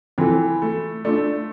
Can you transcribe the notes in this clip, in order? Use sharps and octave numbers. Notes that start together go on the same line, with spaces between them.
E3 C4 F4 A4
A3
A3 D4 F4 A4 D5